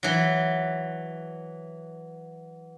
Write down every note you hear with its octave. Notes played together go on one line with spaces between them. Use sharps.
E3 F#3